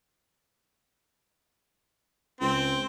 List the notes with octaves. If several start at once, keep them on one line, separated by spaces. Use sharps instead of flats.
C#2 C4